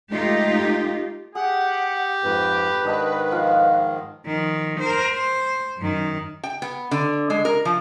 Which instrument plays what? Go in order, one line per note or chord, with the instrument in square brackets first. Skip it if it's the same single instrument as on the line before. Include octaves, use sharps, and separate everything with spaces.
[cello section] G#3 A3 D#4 F4 G4
[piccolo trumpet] G4 [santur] G#4 [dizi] F#5
[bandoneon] F2 G#2 [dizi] B4
[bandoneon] G#2 D#3 [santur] D4 D#5 A5
[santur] F3 F5 F#5
[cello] D#3 F3
A#4 C5
C5
F#2 D#3
[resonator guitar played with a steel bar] G5
B3
D3
G#3
A#4
F3